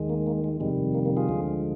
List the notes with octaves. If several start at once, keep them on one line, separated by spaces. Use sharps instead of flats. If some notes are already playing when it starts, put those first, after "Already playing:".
Already playing: D#2 D#3 G#3
A#3
A#3
G#3
F2 C3 D#3 G3 G#3
A#3
A#3
F4 G#4
D2 D3 F3 G#3